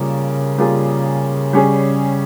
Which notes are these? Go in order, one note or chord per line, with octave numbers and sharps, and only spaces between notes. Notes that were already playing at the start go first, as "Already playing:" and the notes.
Already playing: C#3 G3 A#3 F4
G3 A#3 F4 G#4
G3 C#4 G#4